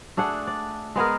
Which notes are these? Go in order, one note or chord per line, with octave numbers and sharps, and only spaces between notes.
A3 D4 G#4 F#5
D5
G#3 B3 G#4 A#4